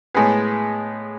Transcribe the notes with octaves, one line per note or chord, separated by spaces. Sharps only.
A2 G#3 B3 G#4